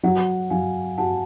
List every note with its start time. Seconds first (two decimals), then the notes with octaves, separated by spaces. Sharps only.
0.03 F#3 F#5
0.50 F#3 F5 G#5
0.98 F#4 F#5 A5